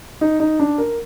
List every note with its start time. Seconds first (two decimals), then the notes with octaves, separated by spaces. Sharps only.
0.21 D#4
0.40 D#4
0.60 D4
0.78 A#4